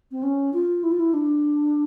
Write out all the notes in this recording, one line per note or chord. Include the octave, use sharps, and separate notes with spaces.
C4
C#4
F4
E4
F4
E4
D4